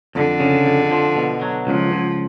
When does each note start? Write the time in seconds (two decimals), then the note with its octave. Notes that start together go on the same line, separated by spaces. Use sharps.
0.15 F2 D3
0.40 C#3
0.65 F2
0.92 F3
1.16 B2
1.42 F#3
1.67 C#2 F3
1.92 C#2